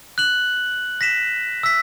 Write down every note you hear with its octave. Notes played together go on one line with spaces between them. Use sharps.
F#6 F#7
A#6 B6 E7
E6 B6